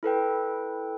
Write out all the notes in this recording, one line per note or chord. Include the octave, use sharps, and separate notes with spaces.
E4 A4 B4 G5